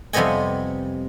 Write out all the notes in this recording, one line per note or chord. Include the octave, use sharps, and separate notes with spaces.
F2 C3 G3 B3 D#5 G#5